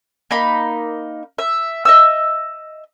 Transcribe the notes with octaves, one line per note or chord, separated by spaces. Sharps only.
A#3 D#4 B5
E5
D#5 E5 E6